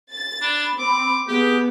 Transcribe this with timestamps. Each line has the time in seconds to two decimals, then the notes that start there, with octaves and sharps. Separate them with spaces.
0.11 A6
0.42 D4 B5
0.79 C4 D6
1.28 B3 G4 G#4